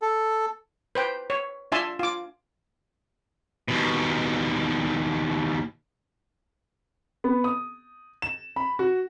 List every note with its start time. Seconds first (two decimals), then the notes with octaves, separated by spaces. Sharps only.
0.02 A4
0.95 B4 C5 G5
1.30 C#5
1.72 D4 F4 E5 G#5 A5 C6
1.99 F4 D6
3.68 D#2 B2
7.24 B3
7.44 D#6
8.22 E7
8.56 B5
8.79 F#4